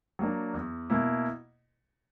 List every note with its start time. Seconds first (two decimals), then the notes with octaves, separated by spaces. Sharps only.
0.19 F#3 A#3 D4
0.54 E2
0.90 B2 A#3 E4